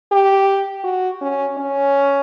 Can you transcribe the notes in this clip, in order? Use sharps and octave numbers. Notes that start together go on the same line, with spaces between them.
G4
F#4
C#4
C#4